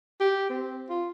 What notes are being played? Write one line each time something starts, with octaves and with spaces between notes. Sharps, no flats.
G4
C4
F4